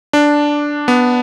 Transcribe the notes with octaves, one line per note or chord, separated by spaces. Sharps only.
D4
B3